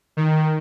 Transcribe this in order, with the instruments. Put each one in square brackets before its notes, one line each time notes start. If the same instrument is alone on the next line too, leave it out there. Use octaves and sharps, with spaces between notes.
[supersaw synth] D#3